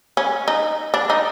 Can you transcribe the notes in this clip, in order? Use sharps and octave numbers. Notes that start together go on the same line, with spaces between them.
C#4
D#4
D4
D#4